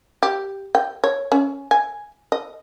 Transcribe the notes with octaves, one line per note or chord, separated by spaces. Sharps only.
G4
G5
C#5
C#4
G#5
D#5